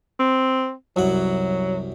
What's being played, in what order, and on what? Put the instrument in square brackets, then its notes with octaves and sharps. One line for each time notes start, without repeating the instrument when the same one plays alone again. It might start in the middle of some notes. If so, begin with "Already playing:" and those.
[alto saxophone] C4
[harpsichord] C2 F#2 F#5 [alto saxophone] F#3